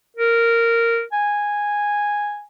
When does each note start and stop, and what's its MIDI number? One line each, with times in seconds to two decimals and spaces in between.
0.17 1.02 70
1.12 2.43 80